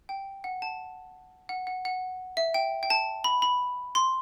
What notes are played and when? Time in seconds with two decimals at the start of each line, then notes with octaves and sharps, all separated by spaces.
0.09 G5
0.44 F#5
0.62 A5
1.49 F#5
1.67 F#5
1.85 F#5
2.37 E5
2.54 G5
2.83 G5
2.90 A5
3.24 B5
3.42 B5
3.95 C6